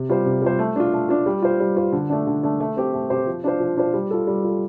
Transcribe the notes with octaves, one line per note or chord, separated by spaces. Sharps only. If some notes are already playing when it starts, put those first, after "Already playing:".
Already playing: C3
G3 F4 C5
C3
G3 F4 C5
A3
D4 F4
A3
D4 F4
G3
F4 C5
G3
F4 C5
D3
A3 D4
D3
A3 D4
A3
C4 G4 C5
A3
C4 G4 C5
F3
D4 F4 C5
F3
D4 F4 C5
G3
F4 A4
G3
F4 A4